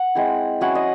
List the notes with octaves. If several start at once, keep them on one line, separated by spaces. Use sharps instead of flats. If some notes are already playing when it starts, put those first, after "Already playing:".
Already playing: F#5
G#3 C4 E4
F#3 C#4 E4 F#5
D#5